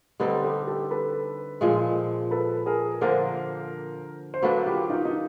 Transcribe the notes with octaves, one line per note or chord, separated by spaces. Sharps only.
D3 G3 C4 D#4 A4 B4
G4 A4
G4 A4
A4 B4
A#2 F3 G#3
A4 B4
G#4 A#4
D3 F3 A#3 D4 A#4 C5
C5
F#3 A#3 D4 A4 B4
F4 G4
D#4 F4
D#4